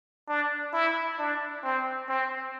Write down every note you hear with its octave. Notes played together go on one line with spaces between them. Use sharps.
D4
E4
D4
C4
C4